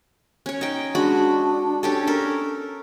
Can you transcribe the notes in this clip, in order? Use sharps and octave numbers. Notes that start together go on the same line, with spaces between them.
C#4 C#5
D#4 G5
G#3 D4 F#4 B5
C#4 G4 A4
A4 A#4